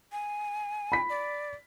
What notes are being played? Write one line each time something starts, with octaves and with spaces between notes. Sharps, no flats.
G#5
B5 B6
D5